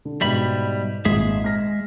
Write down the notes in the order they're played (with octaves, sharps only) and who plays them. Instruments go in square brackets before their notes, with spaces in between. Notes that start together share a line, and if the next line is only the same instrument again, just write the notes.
[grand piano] D3
[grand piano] G#2 B2 [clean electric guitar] G3 E5 B5
[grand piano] G#1 A#2 [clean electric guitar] G#3 G#4 E5
[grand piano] F6 A#6